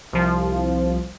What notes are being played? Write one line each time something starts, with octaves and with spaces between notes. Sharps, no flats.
C2 F3